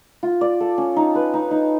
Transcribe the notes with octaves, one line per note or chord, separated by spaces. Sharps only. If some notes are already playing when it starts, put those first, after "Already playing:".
F4
D5
A4
C#4
D#4
B4
D#4
D#4